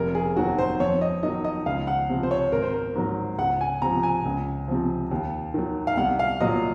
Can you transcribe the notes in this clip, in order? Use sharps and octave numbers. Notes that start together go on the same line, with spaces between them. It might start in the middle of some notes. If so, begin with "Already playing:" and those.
Already playing: F1 A#4
G#4
D#2 D#3 F#3 F#4
C5
F2 C#5
D#5
D#3 F#3 D#5
D#5
C#2 F5
F#5
C3 F3
C5
C#5
G#1 A#4
C5
A#4
G#2 F#3
C#2 F#5
G#5
C3 F3 A#5
G#5
C#2
C3 F3
D#2
D#3 F#3
F5
C2 F#5
F5
A#2 F#3 D#5